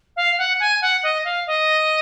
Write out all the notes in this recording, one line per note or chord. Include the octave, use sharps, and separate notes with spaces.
F5
F#5
G#5
F#5
D#5
F5
D#5